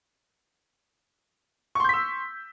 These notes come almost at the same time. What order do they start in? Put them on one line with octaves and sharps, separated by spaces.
C#6 C6 G6 B6 E6